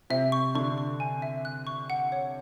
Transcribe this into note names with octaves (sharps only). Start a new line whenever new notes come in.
C3 C4 E5
C#6
D3 D4 C#6
C#6
G#5
E5
F#6
C#6
F#5
C#5